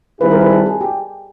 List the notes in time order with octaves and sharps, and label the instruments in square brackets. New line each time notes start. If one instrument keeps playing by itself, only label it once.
[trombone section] D#3 G3 C4 E4 G#4 [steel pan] B4
[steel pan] A#4
B4
A4
G#4
G4